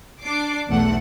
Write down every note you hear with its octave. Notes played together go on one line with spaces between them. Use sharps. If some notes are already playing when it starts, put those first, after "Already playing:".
D4 D6 C7
B1 E2 A3 A4 F#5